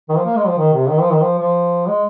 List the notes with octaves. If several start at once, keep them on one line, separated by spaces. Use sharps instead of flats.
D#3
F3
A#3
G#3
F3
D#3
C3
D#3
F3
D#3
F3
F3
G#3